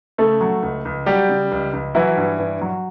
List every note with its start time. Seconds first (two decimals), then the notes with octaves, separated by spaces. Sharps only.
0.18 C#3 A3 A4
0.41 F#3
0.63 C#2
0.85 C#2
1.06 F#3 G3 G4
1.29 C#3
1.51 C#2
1.73 C#2
1.95 E3 F#3 E4
2.17 G2
2.39 G2
2.61 F#3